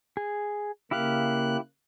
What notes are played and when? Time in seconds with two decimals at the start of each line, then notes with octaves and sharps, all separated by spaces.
0.17 G#4
0.91 C#3 A#3 E4 G4 F5 F#6